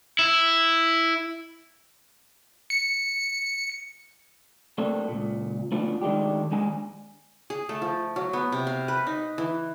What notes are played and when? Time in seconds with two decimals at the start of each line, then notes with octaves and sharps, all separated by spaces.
0.19 E4
2.70 C#7
4.78 A3 A#3 C4 D4 A4
5.08 C#2 A#2
5.72 A3 B3 C#4 D4 F4
6.02 D#3 G#3 A3 D4 G4
6.51 D#2 G#3 D4 G#5
7.50 G#4
7.69 A3
7.82 F3
8.16 F#3
8.33 B3
8.52 C3
8.67 F5
8.88 B4
9.06 D#4
9.38 E3